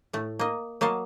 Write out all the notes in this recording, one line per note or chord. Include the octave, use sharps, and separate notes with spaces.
A2 A3
A#3 D#5
F#3 A#3 D#5 F5 A5